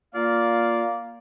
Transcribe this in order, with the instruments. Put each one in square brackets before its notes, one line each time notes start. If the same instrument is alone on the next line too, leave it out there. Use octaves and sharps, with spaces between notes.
[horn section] A#3 F4 D5 F5